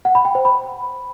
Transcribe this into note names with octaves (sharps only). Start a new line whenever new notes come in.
F#5
B5
G5
C5
B5